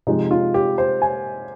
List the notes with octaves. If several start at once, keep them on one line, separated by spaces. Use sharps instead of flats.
C3 F3 G#3 D#4
F4
G4
C5
G#5